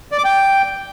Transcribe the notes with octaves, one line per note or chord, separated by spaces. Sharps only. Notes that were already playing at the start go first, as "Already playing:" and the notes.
D5
D6
G5